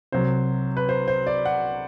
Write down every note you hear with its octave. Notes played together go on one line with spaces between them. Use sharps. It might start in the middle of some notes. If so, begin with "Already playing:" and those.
C2 C3 F#3 C5
B4
C5
C5
D5
F#5